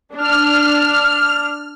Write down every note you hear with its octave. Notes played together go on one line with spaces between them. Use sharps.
D4 F6